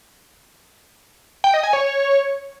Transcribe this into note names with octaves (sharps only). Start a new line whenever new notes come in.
G5
D#5
G#5
C#5